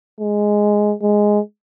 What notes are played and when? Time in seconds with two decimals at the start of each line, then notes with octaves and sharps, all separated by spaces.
0.20 G#3
1.02 G#3